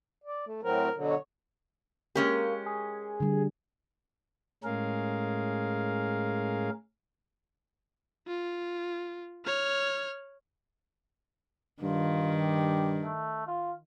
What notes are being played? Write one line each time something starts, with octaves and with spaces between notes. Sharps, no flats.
D5
A3
A2 F#3 C4 A#4
B2 D3 F#3
C#5
G#3 A#3 C#4 G4 A#4
G#4
D3 G3
A2 G#3 C#4 G#4 A#4 F5
F4
C#5 F6
G2 D#3 F4
G4
A3
F4